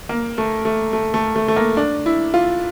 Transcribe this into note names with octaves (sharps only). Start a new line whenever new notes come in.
A#3
A3
A3
A3
A3
A3
A3
A#3
D4
E4
F4